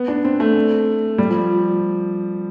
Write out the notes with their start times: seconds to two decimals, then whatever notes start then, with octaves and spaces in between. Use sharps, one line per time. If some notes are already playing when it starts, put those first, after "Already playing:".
Already playing: B3
0.08 D4
0.25 C4
0.40 A3
1.18 G3
1.30 F3